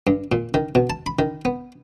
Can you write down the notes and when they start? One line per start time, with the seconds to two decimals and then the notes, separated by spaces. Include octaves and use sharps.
0.07 G2
0.32 A#2
0.54 D#3
0.75 B2
0.90 A5
1.06 B5
1.19 D#3
1.45 B3